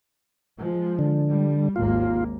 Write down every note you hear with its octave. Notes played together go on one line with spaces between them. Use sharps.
F3 G#3
D3
G3
G#1 D#2 A#3 F4